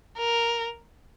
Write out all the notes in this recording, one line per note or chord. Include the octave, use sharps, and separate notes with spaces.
A#4